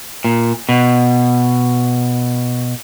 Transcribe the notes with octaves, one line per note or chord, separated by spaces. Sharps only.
A#2
B2